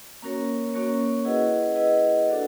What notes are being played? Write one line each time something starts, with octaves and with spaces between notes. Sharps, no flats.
A#3 C#4 F#4 A#4 C#5
A#3 C#4 F#4 A#4 C#5
E4 G#4 B4 D#5 F#5
E4 G#4 B4 D#5 F#5
D4 F#4 A4 D5 F#5